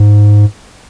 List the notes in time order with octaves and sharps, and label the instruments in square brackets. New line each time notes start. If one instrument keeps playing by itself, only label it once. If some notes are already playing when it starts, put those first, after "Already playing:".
Already playing: [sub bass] G#2